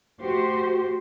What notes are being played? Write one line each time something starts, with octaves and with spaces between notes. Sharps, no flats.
A3 F#4 G4 C5